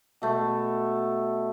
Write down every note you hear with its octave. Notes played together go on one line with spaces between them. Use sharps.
B2 A3